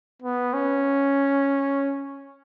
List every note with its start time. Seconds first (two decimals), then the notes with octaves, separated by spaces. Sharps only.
0.22 B3
0.54 C#4